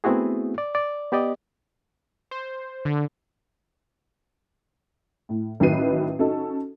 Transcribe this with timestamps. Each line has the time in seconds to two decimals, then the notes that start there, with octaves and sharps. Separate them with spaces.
0.04 A3 B3 C4 E4 F#4 G#4
0.58 D5
0.75 D5
1.12 B3 G4 D5 D#5
2.31 C5
2.85 D3
5.29 A2
5.60 A1 D#3 F#3 B4 C7 D#7
6.19 C#4 D#4 F#4 A4